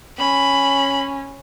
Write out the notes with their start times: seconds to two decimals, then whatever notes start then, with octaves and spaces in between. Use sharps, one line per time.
0.18 C#4 B5